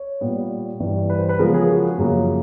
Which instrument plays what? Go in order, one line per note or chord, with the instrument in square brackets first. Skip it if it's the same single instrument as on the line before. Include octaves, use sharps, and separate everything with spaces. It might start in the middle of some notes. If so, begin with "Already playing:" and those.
Already playing: [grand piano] C#5
A#2 G3 B3
G2 E3 G3
B4
C5
B4
C#3 F3 G#3 B3 A#4
G#4
F#4
F#2 C#3 F3 A#3